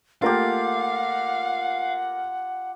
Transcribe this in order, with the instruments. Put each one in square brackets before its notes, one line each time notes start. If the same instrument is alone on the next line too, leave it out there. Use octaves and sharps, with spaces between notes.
[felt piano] A3 A#3 A#4 [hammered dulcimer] F4 G4 [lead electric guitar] F5 [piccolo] F#5